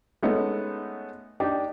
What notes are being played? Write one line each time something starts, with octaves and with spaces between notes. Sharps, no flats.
G#3 A3 B3 C#4 D#4
D4 D#4 G4